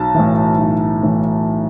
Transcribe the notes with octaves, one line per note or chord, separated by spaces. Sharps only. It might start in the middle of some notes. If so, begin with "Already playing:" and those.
Already playing: B1 A5
A2 E3
B1
A2 E3